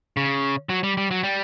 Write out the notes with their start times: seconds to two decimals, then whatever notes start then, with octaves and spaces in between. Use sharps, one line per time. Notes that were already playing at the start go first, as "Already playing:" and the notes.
0.17 C#3
0.69 F#3
0.83 G3
0.97 G3
1.11 F#3
1.23 G3